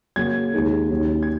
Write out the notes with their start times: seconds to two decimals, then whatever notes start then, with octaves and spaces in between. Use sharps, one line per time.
0.16 C#3 F#3 A#3 C#4 G#6
0.54 D#2 D#3 G#3 D#4
0.90 D#2 D#3 F#3 C#4
1.23 G#6